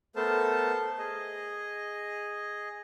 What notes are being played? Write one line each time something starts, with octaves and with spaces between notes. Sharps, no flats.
A3 B3 A4 A#4 C5 A5
G#4 D#5